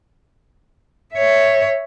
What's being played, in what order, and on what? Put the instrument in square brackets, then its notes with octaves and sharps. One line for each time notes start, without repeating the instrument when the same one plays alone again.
[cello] C#5 E5